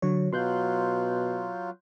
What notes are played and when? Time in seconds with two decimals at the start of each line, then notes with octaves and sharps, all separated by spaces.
0.02 D3 F#3 C#5
0.33 B2 F#3 F4 C6 F#6 G6